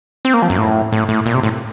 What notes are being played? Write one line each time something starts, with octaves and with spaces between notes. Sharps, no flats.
C4
A#3
F3
F#2
A2
A2
A2
A#2
C3
A2